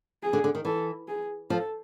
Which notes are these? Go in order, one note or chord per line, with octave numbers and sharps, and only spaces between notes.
G#4
D3
D3
D#3
E3 A4
G#4
F3 A4